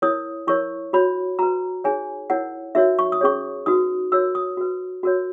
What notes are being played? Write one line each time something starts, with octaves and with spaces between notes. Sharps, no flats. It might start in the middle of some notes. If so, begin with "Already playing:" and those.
E4 A#4 C#5 D#6
E4 A#4 C#5 C#6
F#4 C#5 B5
F#4 B4 A#5
D#4 G#4 C#5 G#5
E4 A#4 C#5 F#5
D#4 F#4 A#4 C#5 E5
C#6
D#6
C#4 G#4 C#5 C#6
D#4 F#4 B4 D#6
F#4 A#4 C#5 E6
D#6
F#4 B4
F#4 A#4 C#5